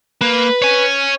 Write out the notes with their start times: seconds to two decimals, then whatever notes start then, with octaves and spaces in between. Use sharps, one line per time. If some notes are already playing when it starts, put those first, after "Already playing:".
0.21 A#3 B4
0.62 C#5 G#5